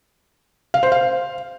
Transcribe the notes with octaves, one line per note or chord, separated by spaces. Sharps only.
F5
C5
F5